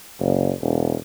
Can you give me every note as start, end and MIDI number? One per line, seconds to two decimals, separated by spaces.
0.20 0.51 30
0.61 0.94 28